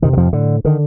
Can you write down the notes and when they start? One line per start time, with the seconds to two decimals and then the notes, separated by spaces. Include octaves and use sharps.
0.02 F2 C3 D#3
0.13 D#3
0.17 F2 F3
0.33 A2 D3
0.65 D3 D#3